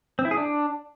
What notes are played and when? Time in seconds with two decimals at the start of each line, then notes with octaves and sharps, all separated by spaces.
0.19 C4
0.25 E4
0.31 G#4
0.37 D4